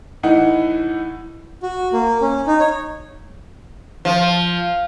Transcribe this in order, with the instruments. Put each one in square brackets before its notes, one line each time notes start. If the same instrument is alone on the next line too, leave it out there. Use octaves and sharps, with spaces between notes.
[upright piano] A2 E3 D#4 F#5
[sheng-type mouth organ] F#4
A#3
C#4
D#4
C#5
[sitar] F3